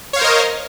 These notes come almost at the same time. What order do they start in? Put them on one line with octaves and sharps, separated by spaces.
C#5 F5 C5 A#4 D#5